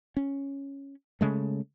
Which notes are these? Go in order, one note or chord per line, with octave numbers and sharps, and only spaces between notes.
C#4
C#3 G#3 A3